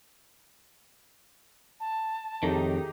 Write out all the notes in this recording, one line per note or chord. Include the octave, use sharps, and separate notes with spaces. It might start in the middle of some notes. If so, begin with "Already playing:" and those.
A5
F2 A2 D#3 D#4 G4 G#4